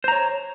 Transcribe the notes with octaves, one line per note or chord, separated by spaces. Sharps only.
C5 C#5 A#5